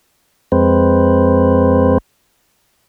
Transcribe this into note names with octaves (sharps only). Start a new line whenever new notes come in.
F2 G#3 C4 B4 C5